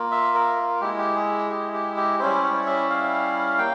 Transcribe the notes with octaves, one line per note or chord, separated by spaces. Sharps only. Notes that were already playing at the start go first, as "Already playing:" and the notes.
Already playing: A#3 F4
E5
A#4
G#3 E4 G4
G4
G#4
G4
G4
G4
G3 C#4 E4 C5
C#5
E5
F5
A#3 G5